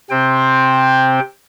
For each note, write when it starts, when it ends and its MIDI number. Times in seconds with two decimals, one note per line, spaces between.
0.10 1.20 48
0.10 1.20 60
0.10 1.20 72
0.10 1.20 79